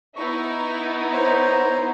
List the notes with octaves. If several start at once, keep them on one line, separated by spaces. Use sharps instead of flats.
B3 D#4 E4 C#6
C5 C#5 A#5